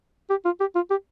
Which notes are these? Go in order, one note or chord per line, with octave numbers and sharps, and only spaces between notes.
G4
F4
G4
F4
G4